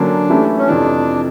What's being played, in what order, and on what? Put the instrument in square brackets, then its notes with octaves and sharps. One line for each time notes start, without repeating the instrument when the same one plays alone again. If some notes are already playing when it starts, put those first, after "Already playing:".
Already playing: [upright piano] D3 F#3 A#3 C#4 [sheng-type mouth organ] D4
[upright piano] E3 A3 C#4 E4 G4
[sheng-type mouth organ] C#4
[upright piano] F2 C3 E3 [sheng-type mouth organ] D4